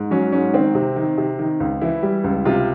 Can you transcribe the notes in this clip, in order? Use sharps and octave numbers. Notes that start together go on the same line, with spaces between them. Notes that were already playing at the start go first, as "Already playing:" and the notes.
Already playing: G#2
F#3 C#4
G#2 C#4
D#3 C4
C3
D#3
C3
D#3
C#2
E3 E4
G3
C#2
C3 F4